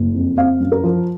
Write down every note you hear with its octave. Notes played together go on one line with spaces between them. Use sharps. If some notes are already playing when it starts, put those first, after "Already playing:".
Already playing: F#1
F2
C4 F5
F#2
A#4
F3